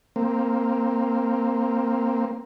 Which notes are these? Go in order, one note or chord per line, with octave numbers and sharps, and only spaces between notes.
A#3 C4